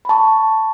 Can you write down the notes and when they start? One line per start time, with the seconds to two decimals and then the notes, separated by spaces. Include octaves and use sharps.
0.05 B5
0.09 A5 C#6